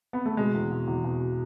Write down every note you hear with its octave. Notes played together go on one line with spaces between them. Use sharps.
B3
A3
B2 G#3
E2
B2
E2
B2